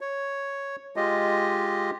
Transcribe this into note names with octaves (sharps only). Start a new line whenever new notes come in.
C#5
G#3 F4 G4 D#5